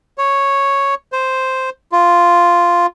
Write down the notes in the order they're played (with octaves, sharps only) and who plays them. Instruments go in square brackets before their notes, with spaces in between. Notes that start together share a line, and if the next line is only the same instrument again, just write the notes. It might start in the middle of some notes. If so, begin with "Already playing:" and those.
[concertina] C#5
C5
F4